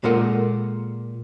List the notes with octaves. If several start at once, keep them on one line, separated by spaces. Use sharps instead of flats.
A#2 G#3 F4 A4 A#4 F#5